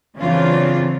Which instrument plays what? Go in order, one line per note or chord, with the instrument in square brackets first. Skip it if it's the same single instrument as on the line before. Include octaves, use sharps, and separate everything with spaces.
[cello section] C#3 E3 F#3 C4 D4 F4